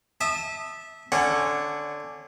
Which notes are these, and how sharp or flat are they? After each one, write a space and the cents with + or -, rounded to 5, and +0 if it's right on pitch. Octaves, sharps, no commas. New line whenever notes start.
E5 -20 A5 +0 D#6 -30
D3 +0 C#4 -15 F#5 +0